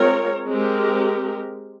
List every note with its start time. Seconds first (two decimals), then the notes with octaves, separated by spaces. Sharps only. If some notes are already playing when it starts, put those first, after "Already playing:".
Already playing: G#3 C4 F4 A#4 C#5
0.49 G#3 C4 G4 A#4